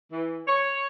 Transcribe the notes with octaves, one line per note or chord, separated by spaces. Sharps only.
E3
C#5